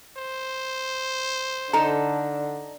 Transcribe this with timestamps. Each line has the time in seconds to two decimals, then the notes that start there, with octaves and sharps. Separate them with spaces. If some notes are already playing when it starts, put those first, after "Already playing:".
0.17 C5
1.73 D3 D#4 A4 A#5